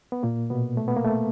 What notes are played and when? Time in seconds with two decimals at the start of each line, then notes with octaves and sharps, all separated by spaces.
0.12 B3
0.23 A#2 A#3
0.50 B2 B3
0.77 A3
0.88 B3
0.96 A#3
1.05 A3